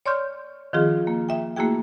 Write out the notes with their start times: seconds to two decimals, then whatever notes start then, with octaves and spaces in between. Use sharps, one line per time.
0.06 C#5 D5 C6 C#6 F6 G6
0.73 D#3 F3 C4 F4 G#4
1.07 A#3
1.29 E5 G5
1.56 A3 A#3 E4 F#4 G#4 G5